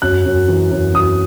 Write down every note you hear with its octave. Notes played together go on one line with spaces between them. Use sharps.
F#2 F#6
F#2
E3
F#2
F#2 D#6